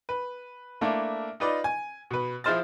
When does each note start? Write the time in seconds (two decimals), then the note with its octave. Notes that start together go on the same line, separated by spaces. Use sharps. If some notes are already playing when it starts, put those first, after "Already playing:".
0.09 B4
0.81 A3 A#3 D4 E4
1.40 D#4 F4 B4 D5 D#5
1.64 G#5
2.11 B2 B4
2.44 F3 E4 G#4 C5 F6 A6